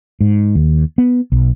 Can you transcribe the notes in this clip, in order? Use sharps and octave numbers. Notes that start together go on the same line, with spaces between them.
G#2
D#2
B3
B1